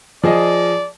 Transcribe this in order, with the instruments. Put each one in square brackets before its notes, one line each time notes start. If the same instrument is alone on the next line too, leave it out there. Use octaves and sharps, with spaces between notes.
[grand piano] F3 G#4 D#5 [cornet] D5